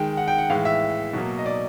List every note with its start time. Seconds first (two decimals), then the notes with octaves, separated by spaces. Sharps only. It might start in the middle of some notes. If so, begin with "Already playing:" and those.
Already playing: D#3 G#3 G5
0.17 F#5
0.28 G5
0.38 F#5
0.50 A2 E3 G#3 F5
0.65 E5
1.13 B2 F#3 A#3
1.39 D#5
1.46 D5